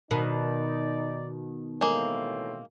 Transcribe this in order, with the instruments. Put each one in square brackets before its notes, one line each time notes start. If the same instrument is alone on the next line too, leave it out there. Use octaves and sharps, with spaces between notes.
[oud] B2 D#3 [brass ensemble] D#4 D5
[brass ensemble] A2 E3 C4 [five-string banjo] G#3 A#3